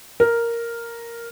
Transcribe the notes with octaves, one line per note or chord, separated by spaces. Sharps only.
A#4